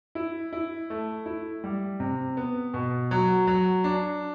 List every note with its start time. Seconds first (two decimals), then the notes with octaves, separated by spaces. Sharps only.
0.15 E4
0.53 E4
0.90 A3
1.26 E4
1.64 G3
2.00 C3
2.37 B3
2.74 B2
3.11 F#3
3.47 F#3
3.84 D4